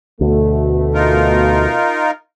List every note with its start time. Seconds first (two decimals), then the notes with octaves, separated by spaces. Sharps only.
0.21 D2 B2 A3
0.94 D#4 F4 A#4